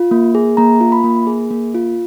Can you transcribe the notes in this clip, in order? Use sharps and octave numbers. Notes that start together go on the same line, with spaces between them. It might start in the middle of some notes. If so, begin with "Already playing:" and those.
Already playing: F4
A#3
G#4
A#3 A#5
F4
B5
A#3
G#4
A#3
F4